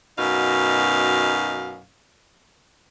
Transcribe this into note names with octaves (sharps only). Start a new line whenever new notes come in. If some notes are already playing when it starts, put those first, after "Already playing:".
F#2 B2 D#4 F5